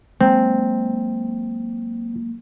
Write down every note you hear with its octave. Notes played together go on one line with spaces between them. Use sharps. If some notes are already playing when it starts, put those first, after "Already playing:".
F#3 G#3 A#3 C4